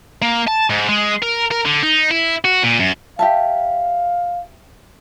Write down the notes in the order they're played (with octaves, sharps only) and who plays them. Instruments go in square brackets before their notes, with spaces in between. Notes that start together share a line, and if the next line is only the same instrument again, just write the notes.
[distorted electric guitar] A#3
A5
G#2
G#3
A#4
A#4
D3
D#4
E4
F#4
A#2
F#2
[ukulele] G4 E5 A5 [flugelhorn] F5